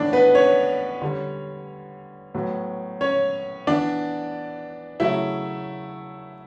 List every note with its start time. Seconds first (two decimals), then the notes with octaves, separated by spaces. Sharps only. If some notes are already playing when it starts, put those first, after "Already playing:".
Already playing: A2 E3 B3 D4 D5
0.13 B3 B4
0.35 C#4 C#5
1.02 D3 G3 C#4
2.34 A2 F#3 B3
3.01 C#4 C#5
3.67 E3 B3 D4 D5
5.00 C#3 F#3 A3 C#4 E4 E5